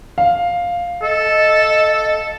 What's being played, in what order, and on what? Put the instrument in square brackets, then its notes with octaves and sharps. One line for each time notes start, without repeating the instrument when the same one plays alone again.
[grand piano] F5
[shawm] A4 [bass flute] D#5